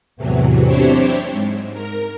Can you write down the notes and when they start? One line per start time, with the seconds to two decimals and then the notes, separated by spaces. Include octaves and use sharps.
0.17 E2 A2 C3 E3 F#3
0.65 C4 D4 E4 G4 C5 C#5
1.31 G#2
1.73 A#4